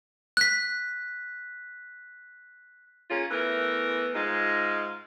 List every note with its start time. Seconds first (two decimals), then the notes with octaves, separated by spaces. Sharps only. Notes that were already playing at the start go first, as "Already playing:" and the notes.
0.37 F#6 B6
3.10 A#3 C#4 F4 G#4
3.31 E3 A3 B3 A#4
4.14 G#2 G#3 D#4 F4